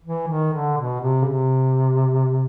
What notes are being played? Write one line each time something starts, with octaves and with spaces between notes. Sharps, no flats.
E3
D#3
D3
B2
C3
C#3
C3